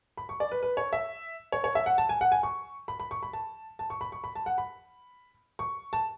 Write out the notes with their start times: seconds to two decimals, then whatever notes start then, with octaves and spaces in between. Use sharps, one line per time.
0.17 B5
0.29 C#6
0.40 D5
0.51 B4
0.63 B4
0.77 C#5
0.93 E5
1.52 C#5
1.64 C#5
1.75 E5
1.86 F#5
1.98 A5
2.09 G#5
2.21 F#5
2.32 G#5
2.43 C#6
2.88 B5
3.00 B5
3.11 C#6
3.23 B5
3.33 A5
3.79 A5
3.90 C#6
4.01 B5
4.12 C#6
4.24 B5
4.35 A5
4.46 F#5
4.58 B5
5.59 C#6
5.93 A5